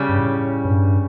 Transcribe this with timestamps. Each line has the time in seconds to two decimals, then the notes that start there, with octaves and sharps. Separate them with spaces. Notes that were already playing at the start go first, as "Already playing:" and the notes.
Already playing: C#3 G3 C#4
0.09 G2
0.19 A2
0.65 G2